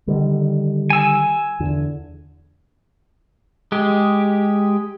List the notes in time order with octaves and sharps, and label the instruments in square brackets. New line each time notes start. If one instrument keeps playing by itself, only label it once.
[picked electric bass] D3 D#3 G3
[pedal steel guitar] G#5 E6
[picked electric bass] E2 D3
[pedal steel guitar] G#3 G4